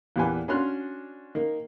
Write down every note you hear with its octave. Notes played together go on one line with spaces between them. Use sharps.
E2 A#2 G4 B4 G#5
C#4 D4 F#4 C6 F6 F#6
D#3 A#3